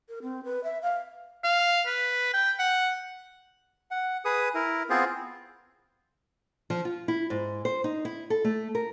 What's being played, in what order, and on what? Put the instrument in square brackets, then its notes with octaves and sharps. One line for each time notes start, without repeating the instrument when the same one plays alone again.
[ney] A#4
C4
B4
E5
F5
[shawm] F5
B4
G5
F#5
[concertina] F#5
G#4 B4 D#6
E4 A#4
B3 C4 F4 G#4 C5
[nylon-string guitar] F3
F4
E4
G#2
C5
D#4
E4
A4
A3
A#4